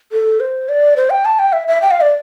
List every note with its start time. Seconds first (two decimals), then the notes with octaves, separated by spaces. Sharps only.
0.12 A4
0.40 C5
0.69 D5
0.96 C5
1.10 G5
1.25 A5
1.39 G5
1.52 E5
1.68 E5
1.82 G5
1.91 F5
2.01 D5